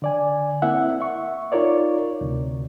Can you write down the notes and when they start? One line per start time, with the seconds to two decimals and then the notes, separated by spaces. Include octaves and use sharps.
0.02 D3 D5 G#5
0.62 A#3 C4 E4 E5 F#5
1.01 E5 C#6
1.52 D#4 F4 A#4 C#5 D5
2.21 D2 C3